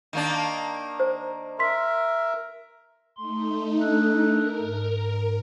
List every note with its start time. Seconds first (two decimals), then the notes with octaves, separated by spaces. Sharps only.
0.13 D#3 A#3 D4
1.00 C5
1.59 A#4 E5 C6 B6
3.17 A3 D#4 C6
3.81 D4 A4 F#6
4.25 A#4
4.61 G#2